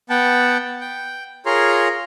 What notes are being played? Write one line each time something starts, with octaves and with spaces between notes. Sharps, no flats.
B3 F#5 G5 A5
G5
F4 G#4 A#4 C#5 A#5 C6